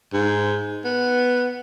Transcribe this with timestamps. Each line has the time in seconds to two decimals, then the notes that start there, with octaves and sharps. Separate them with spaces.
0.13 G#2
0.85 B3